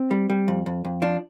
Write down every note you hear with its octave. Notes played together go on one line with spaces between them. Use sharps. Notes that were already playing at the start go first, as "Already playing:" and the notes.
Already playing: C4
G3
G3
F2
F2
F2
F3 D4